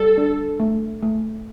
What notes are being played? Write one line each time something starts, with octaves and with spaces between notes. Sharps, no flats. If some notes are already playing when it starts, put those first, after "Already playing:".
Already playing: G3 A4
D4
A3
A3